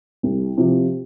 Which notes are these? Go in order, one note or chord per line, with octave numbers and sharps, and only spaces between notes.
C2
C3 F3